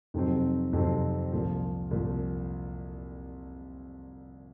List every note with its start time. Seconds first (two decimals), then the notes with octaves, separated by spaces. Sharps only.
0.14 F2 C3 D#3 F#3 C4
0.73 F2 C3 D#3 F#3 C4
1.32 C2 A#2 F3
1.91 C2 A#2 F3